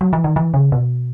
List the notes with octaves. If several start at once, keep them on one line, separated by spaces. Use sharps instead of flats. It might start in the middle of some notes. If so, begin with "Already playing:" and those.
F#3
E3
D#3
E3
C#3
B2